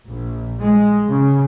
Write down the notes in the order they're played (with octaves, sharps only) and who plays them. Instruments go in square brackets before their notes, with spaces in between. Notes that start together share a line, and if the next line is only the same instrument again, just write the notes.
[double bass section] A#1
G#3
C#3